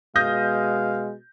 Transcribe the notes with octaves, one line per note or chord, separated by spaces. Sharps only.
B2 G#3 F5 D#6 G6 A#6